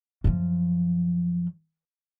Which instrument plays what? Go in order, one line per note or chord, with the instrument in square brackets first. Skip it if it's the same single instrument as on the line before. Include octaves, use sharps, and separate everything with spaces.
[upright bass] F#2 F3